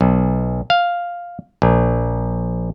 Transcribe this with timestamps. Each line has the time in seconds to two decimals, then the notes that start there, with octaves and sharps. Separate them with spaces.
0.01 B1
0.70 F5
1.62 A#1